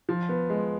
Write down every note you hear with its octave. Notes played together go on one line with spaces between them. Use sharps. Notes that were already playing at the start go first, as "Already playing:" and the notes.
F3
B3
G#3